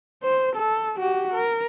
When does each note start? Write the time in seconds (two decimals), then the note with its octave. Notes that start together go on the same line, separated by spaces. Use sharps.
0.24 C5
0.56 A4
0.98 F#4 G4
1.34 A#4